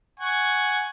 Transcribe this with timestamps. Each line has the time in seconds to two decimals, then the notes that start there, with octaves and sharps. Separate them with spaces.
0.20 F#5 G#5 C#6